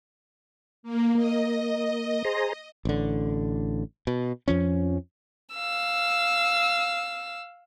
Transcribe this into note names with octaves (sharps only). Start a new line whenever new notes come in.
A#3
A#3 D#5
G#4 C5 A#5
A1 D3
B2
F2 F3 C#4
F5 E6